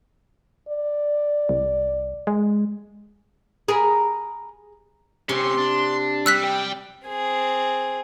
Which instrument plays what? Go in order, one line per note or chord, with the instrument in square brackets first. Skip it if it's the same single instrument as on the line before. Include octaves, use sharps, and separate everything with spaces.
[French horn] D5
[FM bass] C2
G#3
[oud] G#4 [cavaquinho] A#4 A#5 B5
[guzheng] C3 [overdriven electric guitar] C4 C#4 [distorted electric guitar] C6
[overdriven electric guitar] D4
[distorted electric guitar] G3 [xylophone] E6 F#6 B6
[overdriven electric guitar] G5
[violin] C4 G#4